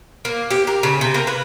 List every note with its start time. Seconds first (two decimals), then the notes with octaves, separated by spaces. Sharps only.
0.25 A#3
0.51 G4
0.67 A#4
0.83 C#3
1.01 C3
1.14 A#3
1.27 B4